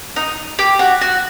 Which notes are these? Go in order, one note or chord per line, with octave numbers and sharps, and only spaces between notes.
D#4
G4
F#4
F#4